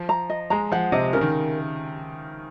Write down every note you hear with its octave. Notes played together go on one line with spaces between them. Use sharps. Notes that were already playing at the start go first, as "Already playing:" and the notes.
Already playing: F3
A#5
D#5
G#3 A#5
F3 F#5
C3 D#5
C#3 A#4
D#3